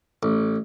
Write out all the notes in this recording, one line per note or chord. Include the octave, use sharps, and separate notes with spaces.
A1